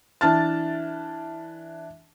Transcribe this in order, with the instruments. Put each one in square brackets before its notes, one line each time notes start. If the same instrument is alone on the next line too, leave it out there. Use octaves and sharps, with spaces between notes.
[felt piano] E3 D4 A5 F6 A6